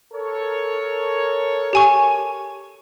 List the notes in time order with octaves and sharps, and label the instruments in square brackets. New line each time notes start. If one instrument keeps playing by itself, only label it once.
[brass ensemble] A4 A#4 C#5
[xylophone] G4 G#5 C#6